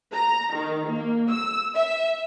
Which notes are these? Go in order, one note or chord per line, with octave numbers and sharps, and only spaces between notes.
A#5
D#3
A#3
E6
E5